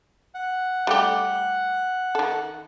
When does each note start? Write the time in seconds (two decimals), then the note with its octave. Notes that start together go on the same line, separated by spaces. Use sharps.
0.35 F#5
0.87 G3 A3 G4
2.15 D#3 A4